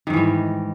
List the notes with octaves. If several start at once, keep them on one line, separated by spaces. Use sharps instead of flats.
G#2 D#3 E3 G3